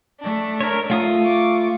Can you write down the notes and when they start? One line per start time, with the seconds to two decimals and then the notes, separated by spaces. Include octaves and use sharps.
0.20 A3 D4
0.61 A#4 C#5
0.90 A3 F4 D#6
1.23 C#6 D6